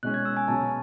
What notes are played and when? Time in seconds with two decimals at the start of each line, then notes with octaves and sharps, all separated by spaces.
0.03 B2 G#3 C#4 F#6
0.14 G#6
0.25 E6
0.37 G#5
0.48 B2 F#3 C#4 A5